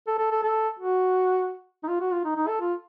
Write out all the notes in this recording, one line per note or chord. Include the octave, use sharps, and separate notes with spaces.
A4
A4
A4
A4
F#4
D#4
F4
F#4
F4
D#4
D#4
A4
F4